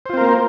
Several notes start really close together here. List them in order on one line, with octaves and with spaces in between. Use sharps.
C5 F4 C4 A#4 A#3